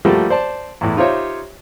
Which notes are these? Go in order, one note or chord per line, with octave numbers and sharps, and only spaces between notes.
F3 G3 A3 A#3 F#4 G4
C5 D5 A5
E2 A2
D#4 F4 G4 C5 C#5 E5